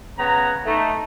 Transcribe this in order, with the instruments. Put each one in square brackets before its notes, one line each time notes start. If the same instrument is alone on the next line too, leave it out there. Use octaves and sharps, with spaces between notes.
[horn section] C#3 B3 F#5 A#5
A3 D#4